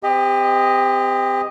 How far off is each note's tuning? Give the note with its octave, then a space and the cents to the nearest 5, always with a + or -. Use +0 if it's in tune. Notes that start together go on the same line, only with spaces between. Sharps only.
C4 -35 G4 +30 D#5 +0